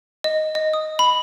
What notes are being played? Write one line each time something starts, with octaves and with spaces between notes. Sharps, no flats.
D#5
D#5
D#6
B5